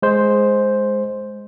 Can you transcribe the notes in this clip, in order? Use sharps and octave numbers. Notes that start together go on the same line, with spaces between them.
G#3 C5